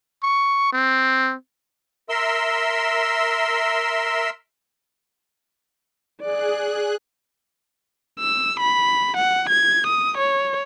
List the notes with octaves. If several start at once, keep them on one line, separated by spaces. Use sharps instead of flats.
C#6
C4
A#4 E5 C6 E6
G#4 D5 F#6
E6
B5
F#5
G#6
D#6
C#5